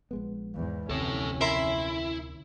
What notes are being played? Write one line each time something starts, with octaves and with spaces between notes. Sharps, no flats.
A#1 G#3 B3
E2 G#2
F1 D2 C3 E3 C#4 A4 C#5
E4 A#4 E5 C6